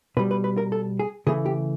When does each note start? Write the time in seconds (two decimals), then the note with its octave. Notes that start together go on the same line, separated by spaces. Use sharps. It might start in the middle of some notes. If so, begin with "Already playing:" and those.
0.17 B2 G3 B4
0.31 B4
0.44 B4
0.58 A#4
0.72 A4
0.99 G#4
1.27 C#3 E3 A3 G#4
1.46 G4